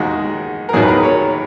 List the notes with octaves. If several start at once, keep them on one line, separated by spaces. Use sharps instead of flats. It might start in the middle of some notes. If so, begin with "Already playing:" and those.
Already playing: D#2 D#3 G#3 F#4
A#4
D#2 D#3 F#3 G#4
B4
A#4
C#5